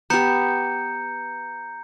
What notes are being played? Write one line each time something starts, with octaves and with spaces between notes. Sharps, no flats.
B3 G4 A#5 G6 C#7